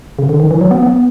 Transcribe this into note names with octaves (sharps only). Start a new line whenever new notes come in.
C#3
D3
D#3
E3
F#3
B3
B3